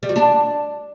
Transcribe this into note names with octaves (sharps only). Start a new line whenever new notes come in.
G3
F#4
D4